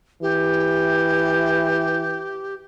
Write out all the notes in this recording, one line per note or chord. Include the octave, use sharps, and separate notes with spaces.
E3 G4